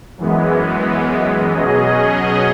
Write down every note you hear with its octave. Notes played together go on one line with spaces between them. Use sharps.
F#2 E3 G#3 B3
B2 F#3 C#4 G#4 D#5